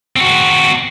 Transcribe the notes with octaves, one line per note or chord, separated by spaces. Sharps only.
C4 F#4